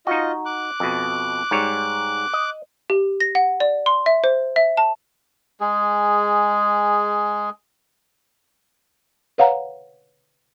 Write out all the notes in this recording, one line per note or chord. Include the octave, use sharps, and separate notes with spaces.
D#4 F4 F#4 D#5
D6 F#6
F2 B2
G#2 G3 C#5
D#5
G4
A#6
F#5
D5
C6
E5
C5
E5
A5
G#3 G#4
B4 C#5 F5 F#5 A#5